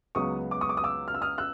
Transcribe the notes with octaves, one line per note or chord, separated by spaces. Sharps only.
C#2 C#3 F#3 B3 C#6 D#6
D6
C#6 D#6
D6
D#6
D6 E6
F6
E6
D#6 F6
E6 F#6